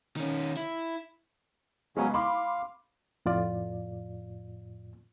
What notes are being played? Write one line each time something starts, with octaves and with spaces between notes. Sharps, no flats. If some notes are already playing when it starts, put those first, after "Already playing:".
D#3 C#4
E4
C#3 F#3 G#3 B3 C#4
F5 B5 C6 D6
F2 A2 F4 D5